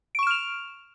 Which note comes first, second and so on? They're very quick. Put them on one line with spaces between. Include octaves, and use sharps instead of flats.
D7 C#6 E7 F6 F7